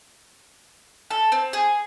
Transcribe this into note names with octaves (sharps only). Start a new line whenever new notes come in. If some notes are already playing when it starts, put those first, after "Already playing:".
A4
C4
G#4